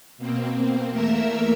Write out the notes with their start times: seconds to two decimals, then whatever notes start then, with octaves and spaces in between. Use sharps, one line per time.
0.17 B2 A#3 C4
0.91 E2 A3 A#3 A#4 E5 E6